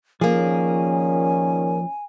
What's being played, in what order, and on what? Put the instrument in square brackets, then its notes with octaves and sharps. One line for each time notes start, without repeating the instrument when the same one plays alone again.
[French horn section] A#2 D#3 C#4 [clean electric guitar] F3 [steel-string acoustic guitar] A#3 G#4 [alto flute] G#5